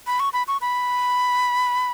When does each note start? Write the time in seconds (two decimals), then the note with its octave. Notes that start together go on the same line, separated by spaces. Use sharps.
0.07 B5
0.20 C#6
0.33 B5
0.48 C#6
0.61 B5